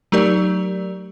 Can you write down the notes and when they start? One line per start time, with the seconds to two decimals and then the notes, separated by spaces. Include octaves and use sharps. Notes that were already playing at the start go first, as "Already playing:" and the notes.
0.12 F#3 A3 D#4 G4 A#4 D5